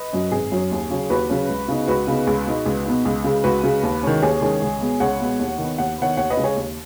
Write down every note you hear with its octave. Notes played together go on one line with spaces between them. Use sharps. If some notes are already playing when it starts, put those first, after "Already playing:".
Already playing: B4 D#5
F#2 F#3 C#4
G#1 G#4
F#2 F#3 C#4
D#2
C#3 F#3 C#4
D#2 F#4 B4
C#3 F#3 C#4
C#2
C#3 B3 D#4
C#2 F#4 B4
C#3 B3 D#4
C#2
B2 B3 D#4
C#2
B2 B3 D#4
C#2
C#3 G#3
C#2 F#4 B4
C#3 G#3
D#2
D#3 G#3 C#4
D#2 G#4 C#5
D#3 G#3 C#4
C#2
B2 G#3 B3
C#2 C#5 F#5
B2 G#3 B3
D#2
D#3 B3
D#2 F#5
D#3 B3 C#5 F#5
D#2 C#5 F#5
B4 D#5
C#3 G#3
G#4 C#5
D#2